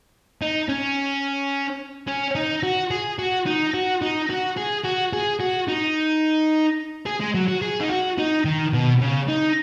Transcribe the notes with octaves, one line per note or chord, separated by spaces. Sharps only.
D#4
C#4
C#4
D#4
F#4
G#4
F#4
D#4
F#4
D#4
F#4
G#4
F#4
G#4
F#4
D#4
G#4
G#3
F#3
F#4
G#4
D#4
F#4
D#4
D#3
B2
C#3
D#4